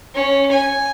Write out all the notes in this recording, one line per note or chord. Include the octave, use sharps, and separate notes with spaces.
C#4
G#5